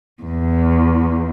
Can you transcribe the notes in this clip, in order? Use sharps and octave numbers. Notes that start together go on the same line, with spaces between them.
E2